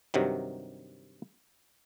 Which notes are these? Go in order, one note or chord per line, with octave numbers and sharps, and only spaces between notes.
G2 C3 D#3 F#3